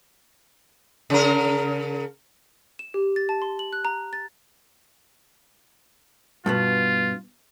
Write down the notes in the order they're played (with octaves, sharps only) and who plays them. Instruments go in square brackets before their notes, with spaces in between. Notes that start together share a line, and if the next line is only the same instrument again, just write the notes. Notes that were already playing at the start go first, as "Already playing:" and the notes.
[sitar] C#3 A#4
[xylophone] E7
G4
A6
A5
C6
F#7
F#6
A#5
A6
[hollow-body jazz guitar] G2 B2 B3 [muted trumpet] F4